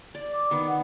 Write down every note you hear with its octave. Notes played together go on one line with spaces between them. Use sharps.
D5
D6
D#3 B3
F#5